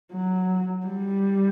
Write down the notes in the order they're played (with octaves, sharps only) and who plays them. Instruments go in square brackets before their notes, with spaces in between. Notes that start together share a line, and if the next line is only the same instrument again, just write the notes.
[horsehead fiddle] F#3
G3